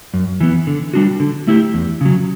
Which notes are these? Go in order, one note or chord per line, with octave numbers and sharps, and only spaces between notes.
F#2
E3 B3
D3
G3 D4 F#4
D3
A3 E4 G4
E2
C#3 F#3